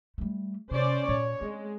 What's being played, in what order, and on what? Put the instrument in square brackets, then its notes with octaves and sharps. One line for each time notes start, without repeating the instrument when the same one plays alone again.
[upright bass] G3 A3
[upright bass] C3 [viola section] C#4 C5 D5
[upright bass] A#2 [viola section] C#5
[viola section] G#3 [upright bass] C4